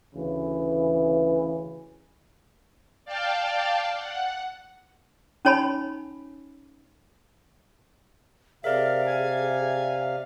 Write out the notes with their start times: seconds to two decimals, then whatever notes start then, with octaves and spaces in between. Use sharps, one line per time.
0.15 D2 C#3 E3
3.05 D5 F5 G5 A5
3.96 F#5
5.45 C#4 D#4 C#5 G#5 B5
8.64 C3 G#4 A#4 D5 E5 F5
9.06 G#5